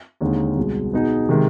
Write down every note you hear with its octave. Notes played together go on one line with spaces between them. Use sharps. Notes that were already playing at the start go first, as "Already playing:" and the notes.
D#2 D3 G#3 C4 D#4
C2 B2 G#3
B2 B3 D#4 G#4
C3 D#3 G#3